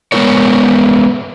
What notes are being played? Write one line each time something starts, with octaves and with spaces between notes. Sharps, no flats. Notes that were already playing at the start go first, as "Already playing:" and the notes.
G#3 B3 C#4 E4 A#4 C#5